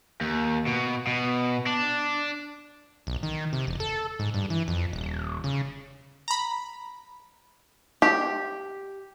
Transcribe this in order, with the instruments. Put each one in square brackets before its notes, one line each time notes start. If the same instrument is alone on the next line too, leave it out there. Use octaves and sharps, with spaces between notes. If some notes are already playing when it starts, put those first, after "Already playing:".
[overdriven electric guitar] D#2
B2
B2
D4
[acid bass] B1
D#3
C3
E1
A4
G#2
G2
E3
F2
D#1
C#3
[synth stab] A#5 B5
[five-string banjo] G4